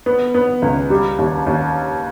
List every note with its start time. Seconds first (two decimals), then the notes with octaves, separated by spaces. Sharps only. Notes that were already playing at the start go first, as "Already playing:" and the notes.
0.06 B3
0.34 B3
0.62 C#2
0.90 G3
1.18 D#2
1.46 D#2